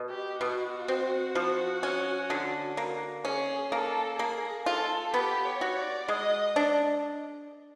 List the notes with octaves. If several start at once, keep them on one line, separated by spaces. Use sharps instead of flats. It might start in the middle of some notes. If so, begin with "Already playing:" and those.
Already playing: B2
G4
B2 F#4
C4
F3
C#4
D3
A#3
C#4 G#4
A#3 A4
A#3 G#4
F4 A4
B3 G4
C#5
F#4
D5
G#3 D#5
D4